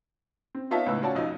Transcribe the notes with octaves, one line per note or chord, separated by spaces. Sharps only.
C4
B3 D#4 F4 C#5 E5 A5
C#2 A2 D#4 B4 E6
C#4 F4 F#4 C#5 D5 A5
B1 F2 D#4